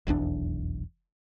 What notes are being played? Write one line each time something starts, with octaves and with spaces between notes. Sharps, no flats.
F1 B1 E2 D4